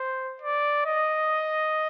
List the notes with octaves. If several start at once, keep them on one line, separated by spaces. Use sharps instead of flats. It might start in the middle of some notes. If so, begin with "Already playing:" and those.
Already playing: C5
D5
D#5